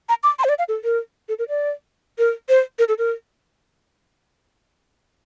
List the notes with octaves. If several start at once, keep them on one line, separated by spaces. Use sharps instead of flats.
A#5
D6
C6
C5
D5
F5
A4
A#4
A4
A#4
D5
A#4
C5
A#4
A4
A#4